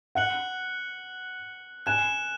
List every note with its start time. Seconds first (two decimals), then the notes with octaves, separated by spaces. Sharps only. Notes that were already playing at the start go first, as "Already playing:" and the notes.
0.15 F#5 F#6 C#7 F#7
1.86 G#5 F#6 E7